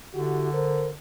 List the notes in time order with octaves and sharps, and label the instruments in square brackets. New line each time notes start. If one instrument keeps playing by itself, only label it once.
[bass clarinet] D3 [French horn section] E4 F#4 G4
[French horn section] A#4 C5